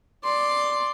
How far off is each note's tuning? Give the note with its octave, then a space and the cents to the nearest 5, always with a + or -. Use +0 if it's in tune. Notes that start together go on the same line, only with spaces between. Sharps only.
D5 +0 C6 +0